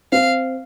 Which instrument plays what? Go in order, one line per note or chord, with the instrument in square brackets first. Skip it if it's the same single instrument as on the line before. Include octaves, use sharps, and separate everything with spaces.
[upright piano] C4 [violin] F5